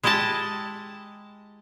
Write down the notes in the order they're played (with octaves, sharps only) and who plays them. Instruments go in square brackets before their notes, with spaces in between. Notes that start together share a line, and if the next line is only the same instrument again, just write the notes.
[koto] G#3 E4 G4 D#5 A5